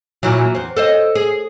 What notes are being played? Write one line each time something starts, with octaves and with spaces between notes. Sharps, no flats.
A#2 E3 F#3
E2 C4
A4 C5 D#5
G#4